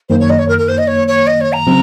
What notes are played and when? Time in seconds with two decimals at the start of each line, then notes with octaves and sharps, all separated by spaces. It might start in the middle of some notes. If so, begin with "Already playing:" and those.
0.09 F#2 D#3 A#3 C5
0.20 C#5
0.30 D#5
0.39 C#5
0.48 A#4
0.58 A#4
0.69 C5
0.78 D#5
0.87 C#5
1.08 C#5
1.27 D#5
1.41 C#5
1.53 A#5
1.67 C#3 F#3 C4